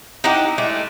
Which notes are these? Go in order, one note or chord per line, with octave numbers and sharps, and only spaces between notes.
D#4 E4 G4 F#5
G#3 A3 D4